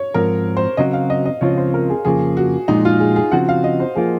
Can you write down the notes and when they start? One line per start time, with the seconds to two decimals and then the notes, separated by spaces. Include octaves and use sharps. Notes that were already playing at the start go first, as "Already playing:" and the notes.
Already playing: C#5
0.14 G#2 F3 C4 A#4
0.57 C5
0.77 C#3 F#3 C4 F#4 D#5
0.93 F5
1.10 D#5
1.25 D#5
1.41 C#2 C#3 F3 C4 F4 C#5
1.58 C5
1.74 A#4
1.90 G#4
2.05 F2 C#3 F3 A#3 G#4
2.37 F#4
2.68 A#2 F3 G#3 D#4
2.85 F4
3.00 G#4
3.16 G#4
3.32 C#3 F3 C4 F#4 F#5
3.49 F5
3.64 D#5
3.80 C5
3.95 F3 A#3 F4 G#4